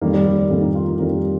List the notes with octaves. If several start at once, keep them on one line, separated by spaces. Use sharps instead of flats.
F2 D#3 G3 A#3
G3
G3
G3
F2 D#3 G3 A#3
D#4
F4
A#4
F2 D#3 G3 A#4
G4